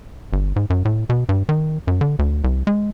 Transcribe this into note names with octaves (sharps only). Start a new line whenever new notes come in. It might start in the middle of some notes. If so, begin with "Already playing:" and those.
G1
G#2
F#2
A2
B2
G2
D#3
F#2
D3
D2
C2
G#3